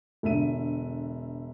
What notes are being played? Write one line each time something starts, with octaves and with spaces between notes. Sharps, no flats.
E1 D3 E5 D#7